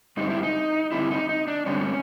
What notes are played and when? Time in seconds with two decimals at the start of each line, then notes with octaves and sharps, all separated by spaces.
0.17 G2 D3 G3 C4 D#4
0.30 E4
0.43 D#4
0.92 G2 D3 G3 C4 E4
1.11 D#4
1.29 D#4
1.48 D4
1.66 G2 D3 G3 C4 C#4